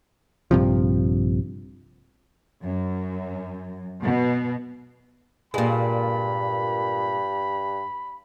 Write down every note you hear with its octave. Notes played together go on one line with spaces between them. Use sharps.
A#1 G2 C3 F3
F#2
B2
G2 A#2 G#3 B5